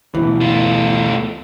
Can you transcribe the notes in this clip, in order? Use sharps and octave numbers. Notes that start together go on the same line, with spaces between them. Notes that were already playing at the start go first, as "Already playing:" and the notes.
D2 B2 E3
A3 F4